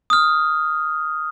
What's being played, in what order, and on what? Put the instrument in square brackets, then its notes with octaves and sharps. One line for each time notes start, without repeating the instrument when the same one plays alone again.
[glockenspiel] D#6 F6